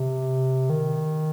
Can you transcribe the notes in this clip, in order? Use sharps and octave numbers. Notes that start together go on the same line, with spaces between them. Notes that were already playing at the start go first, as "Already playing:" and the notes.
Already playing: C3
D#3